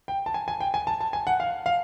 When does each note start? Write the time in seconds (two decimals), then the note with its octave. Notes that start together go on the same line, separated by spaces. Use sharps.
0.08 G5
0.26 A5
0.34 G#5
0.48 G#5
0.61 G5
0.74 G#5
0.87 A5
1.01 A5
1.13 G#5
1.27 F#5
1.40 F5
1.66 F5